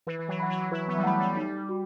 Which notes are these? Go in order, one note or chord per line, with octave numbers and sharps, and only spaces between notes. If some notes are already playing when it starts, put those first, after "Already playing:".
E3 B4
E3
F#3
E3 F#5 B5
F#3
E4 B4
B3
G3
A3 F#5 B5
G3
A3
G3 D#4
F#4